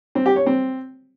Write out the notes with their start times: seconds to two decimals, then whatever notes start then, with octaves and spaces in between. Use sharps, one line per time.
0.15 C4
0.26 G4
0.36 C#5
0.46 C4